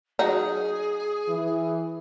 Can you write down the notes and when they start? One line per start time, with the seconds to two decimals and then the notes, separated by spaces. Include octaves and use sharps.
0.19 F#3 D#4 G#4
1.28 E3